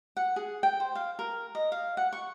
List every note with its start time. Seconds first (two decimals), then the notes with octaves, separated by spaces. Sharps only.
0.17 F#5
0.36 G#4
0.63 G5
0.80 C5
0.95 F5
1.19 A#4
1.55 D#5
1.72 F5
1.97 F#5
2.13 C#6